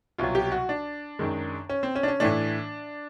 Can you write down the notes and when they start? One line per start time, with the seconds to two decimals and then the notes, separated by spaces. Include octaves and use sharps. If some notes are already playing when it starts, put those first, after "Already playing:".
0.18 C2 B2 F#3 F4
0.35 G4
0.52 F#4
0.69 D4
1.19 F#2 D#3 G#3
1.69 C#4
1.83 C4
1.96 C#4
2.03 D4
2.08 C#4
2.20 A2 E3 A3 D4